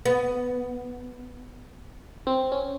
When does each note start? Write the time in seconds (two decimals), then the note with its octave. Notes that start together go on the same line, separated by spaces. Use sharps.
0.06 B3
2.27 C4
2.52 C#4